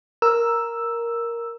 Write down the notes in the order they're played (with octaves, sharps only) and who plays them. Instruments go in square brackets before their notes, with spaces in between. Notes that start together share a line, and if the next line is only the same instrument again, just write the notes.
[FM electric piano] A#4 E6